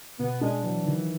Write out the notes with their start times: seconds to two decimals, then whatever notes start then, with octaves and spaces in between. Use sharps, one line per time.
0.19 B2 B3
0.41 G#3 D4
0.63 E3 F#3
0.85 D#3